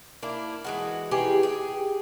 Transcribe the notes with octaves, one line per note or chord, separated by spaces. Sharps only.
A#3 D4 E4
E3 G#3 F#4
D#3 E3 G4 G#4
G#4 G5